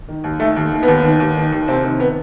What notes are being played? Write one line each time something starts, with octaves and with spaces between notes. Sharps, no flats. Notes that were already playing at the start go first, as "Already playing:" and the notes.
D#3
D#2
D#3 A3
D#2
D#3
B3
D#2
D#3
D#2
D#3
D#2
C3 C4
D#3
B3